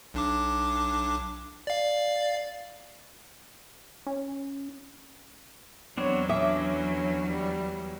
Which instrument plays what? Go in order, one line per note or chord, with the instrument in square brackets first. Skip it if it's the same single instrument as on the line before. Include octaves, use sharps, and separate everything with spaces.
[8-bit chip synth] B1 D4 D6
D5 F5
[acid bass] C#4
[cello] E2 F#3 [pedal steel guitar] B3 C4 D4 [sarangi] C#5
[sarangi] C#4 [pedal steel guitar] D4 D6 D#6 [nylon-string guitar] E5
[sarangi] G3